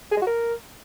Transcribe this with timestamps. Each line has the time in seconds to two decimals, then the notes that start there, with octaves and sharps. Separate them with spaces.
0.11 G#4
0.16 G#3
0.22 F#4
0.27 A#4